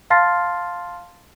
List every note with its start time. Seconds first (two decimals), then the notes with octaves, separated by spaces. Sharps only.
0.10 F5 A5 C6 F6 A6 C7